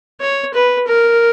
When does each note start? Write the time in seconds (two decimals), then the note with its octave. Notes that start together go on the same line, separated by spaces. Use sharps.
0.21 C#5
0.54 B4
0.88 A#4